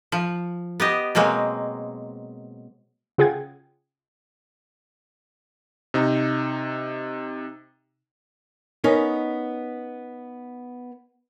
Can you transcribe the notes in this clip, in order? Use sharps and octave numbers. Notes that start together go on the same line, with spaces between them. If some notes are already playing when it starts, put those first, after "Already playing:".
F3
B3 G4 D#5
B2 F#3 G#3 A#3 C4
C#3 F4 G#4 F#5 G5 G#6
C3 D#4
B3 C#4 D#4 A#4